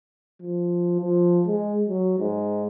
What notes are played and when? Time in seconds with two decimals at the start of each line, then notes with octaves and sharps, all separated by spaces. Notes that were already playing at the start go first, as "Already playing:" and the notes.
0.42 F3
1.00 F3
1.46 G#3
1.89 F#3
2.19 G#2